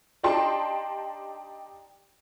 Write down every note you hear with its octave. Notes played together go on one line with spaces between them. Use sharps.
D4 D#4 G4 G5 A5 C6